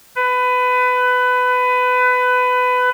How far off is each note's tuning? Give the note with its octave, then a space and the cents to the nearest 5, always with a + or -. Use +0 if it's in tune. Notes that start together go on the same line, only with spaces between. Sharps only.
B4 +20